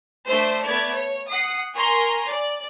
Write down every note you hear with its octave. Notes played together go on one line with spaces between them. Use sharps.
A3 D4 C5
A3 B3 D5 G#6
C#5
F#5 D#6 C7
A#4 G#5 A#5 C6 C#6
D5